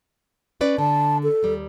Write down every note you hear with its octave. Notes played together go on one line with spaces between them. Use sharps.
C#4 B4 D5
D3 A5
A4
D#2 G3